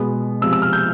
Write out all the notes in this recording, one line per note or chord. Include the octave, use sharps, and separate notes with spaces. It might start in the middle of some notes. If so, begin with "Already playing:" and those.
Already playing: B2 G#3 B3
C3 F3 G#3 E6
E6
F6
G6